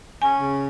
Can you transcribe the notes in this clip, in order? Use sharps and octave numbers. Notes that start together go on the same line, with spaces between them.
C#4 G#5
C#3